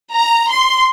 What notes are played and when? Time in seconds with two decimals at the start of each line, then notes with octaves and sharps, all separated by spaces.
0.13 A#5
0.50 C6